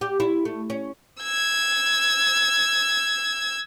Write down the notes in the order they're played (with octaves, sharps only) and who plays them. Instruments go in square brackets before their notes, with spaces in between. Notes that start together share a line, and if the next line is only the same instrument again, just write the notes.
[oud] G4
E4
A3
C#4
[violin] E6 G#6